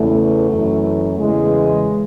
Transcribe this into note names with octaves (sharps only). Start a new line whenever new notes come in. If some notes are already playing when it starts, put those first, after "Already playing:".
Already playing: E2 C#3 E3 A3
F#2 E3
E2 C#3 E3 G#3